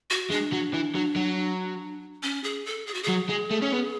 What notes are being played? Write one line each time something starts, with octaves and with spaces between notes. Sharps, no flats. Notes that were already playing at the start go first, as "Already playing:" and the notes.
F#4
G#3 D4
F#3
E3
F#3
F#3
C#4
G#4
A4
G#4
F#4
F#3 G#4
G#3
A3
C#4
B3